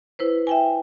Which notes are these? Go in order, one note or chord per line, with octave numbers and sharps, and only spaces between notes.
E4 B4 C5
E5 G5 G#5